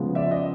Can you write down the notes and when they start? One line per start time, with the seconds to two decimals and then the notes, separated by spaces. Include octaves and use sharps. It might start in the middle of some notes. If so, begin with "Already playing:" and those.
Already playing: C#3 F3 G#3 B3
0.15 D5 E5
0.31 D#5